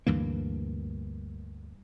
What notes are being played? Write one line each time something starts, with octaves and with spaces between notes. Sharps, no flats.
D2 G2 E3 A#3